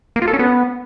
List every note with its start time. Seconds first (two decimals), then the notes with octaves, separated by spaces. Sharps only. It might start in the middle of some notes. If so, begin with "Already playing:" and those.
0.16 A#3
0.22 F4
0.28 A4
0.33 C#4
0.39 B3